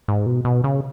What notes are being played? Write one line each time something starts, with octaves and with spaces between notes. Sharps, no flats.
G#2
B2
B2
C#3